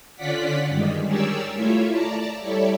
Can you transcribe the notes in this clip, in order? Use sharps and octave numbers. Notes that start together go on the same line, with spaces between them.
D3 C#4 F4 D5 F#5 B6
G2 D#3 G3 G#3
G4 G#4 A#4 C#5 D5 E6
A3 E4 F4 C#5 E5
D5 A5 A#5
G3 E4 A4 C#5 D5 E5